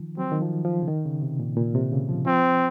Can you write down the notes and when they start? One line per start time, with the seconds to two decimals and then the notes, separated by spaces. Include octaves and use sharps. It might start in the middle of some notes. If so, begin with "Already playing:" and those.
Already playing: D#3 F3
0.17 F#3 C4
0.32 D#3
0.42 F3
0.65 F3
0.82 C#3
0.88 D#3
1.05 C#3
1.22 C3
1.40 A#2
1.57 A#2
1.75 C3
1.92 C#3
2.09 F3
2.26 F3 C4